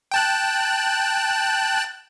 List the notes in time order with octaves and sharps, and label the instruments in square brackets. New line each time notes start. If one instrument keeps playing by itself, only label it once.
[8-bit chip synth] G5 A5 F#6